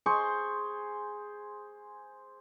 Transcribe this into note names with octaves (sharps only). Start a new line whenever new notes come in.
G#4 C5 C6 C#6